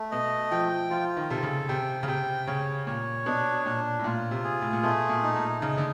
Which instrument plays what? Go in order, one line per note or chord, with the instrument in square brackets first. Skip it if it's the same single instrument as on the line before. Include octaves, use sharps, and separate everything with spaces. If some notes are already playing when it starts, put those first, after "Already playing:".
Already playing: [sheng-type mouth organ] A3
[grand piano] B2 [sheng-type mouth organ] D#5
[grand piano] F3 [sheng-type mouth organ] G5
[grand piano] F3 [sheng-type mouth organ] F4
[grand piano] D#3
[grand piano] C3 [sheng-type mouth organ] A4
[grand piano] C#3
[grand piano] C3 [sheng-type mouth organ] G5
[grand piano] C#3
[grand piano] C3 [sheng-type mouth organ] G5
[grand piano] C#3 [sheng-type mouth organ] C#5
[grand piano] A#2 [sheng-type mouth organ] C#5
[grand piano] B2 [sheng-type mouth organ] D4
[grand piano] A#2 [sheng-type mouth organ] D4
[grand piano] A2
[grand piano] A#2 [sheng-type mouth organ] F4
[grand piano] C3
[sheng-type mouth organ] G#4
[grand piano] A2
A#2
[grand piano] B2 [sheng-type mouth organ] A3
[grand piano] A#2
[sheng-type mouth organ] D#4
[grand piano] A#2
[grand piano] C#3 [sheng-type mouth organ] D#4
[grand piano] D3